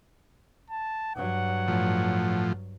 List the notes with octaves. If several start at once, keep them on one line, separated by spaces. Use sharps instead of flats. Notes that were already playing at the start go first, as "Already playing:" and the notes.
A5
G2 F#3 F#5
A2 F3